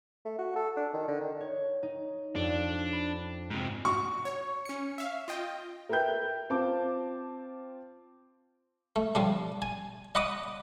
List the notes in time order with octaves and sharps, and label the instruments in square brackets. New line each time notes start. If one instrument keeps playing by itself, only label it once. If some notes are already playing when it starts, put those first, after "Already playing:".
[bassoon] A3
F#4
A4
D4
D#3
D3
D#3
[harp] C#5
D#4
[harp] F2 D5 [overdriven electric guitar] D4
[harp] B5
[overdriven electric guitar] G#2 C3
[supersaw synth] F#4 [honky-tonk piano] C#6
[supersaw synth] C#5
C#4 C#7
E5 F5
F4 D#5 G5
[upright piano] A#4 B4 E5 G5 G6
C4 F4 A5 D6
[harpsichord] A3
F3 G3 D4
G#5
D#5 F#5 B5 D6 D#6